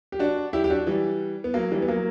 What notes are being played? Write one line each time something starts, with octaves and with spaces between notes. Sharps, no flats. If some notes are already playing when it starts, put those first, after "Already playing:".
G4
D4 F#4
E4 G4
G4
D4 F#4
E3 G3
B3
F#3 A#3
E3 G3
B3
F#3 A#3